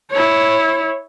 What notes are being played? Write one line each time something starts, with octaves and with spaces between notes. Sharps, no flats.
E4 C#5